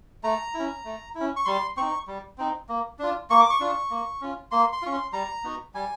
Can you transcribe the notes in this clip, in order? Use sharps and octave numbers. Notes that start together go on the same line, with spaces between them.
A3 A#5
C#4 E4
A3
E4
C#4
C#6
G3 C6
C4 D#4 C#6
G3
C4 D#4
A#3
D4 F4
A#3 C#6
D6
C#6
D4 F4
A#3
C#4 F4
A#3 C6
C6
C#4 F4 C#6
C6
G3 A#5
B3 D#4 F#4
G3 G#5